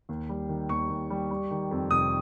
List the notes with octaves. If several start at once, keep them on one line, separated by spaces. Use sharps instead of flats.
D#2
G3
D#3
D#2 C#6
D#2
G3
G3
D#3
F2
F1 D#6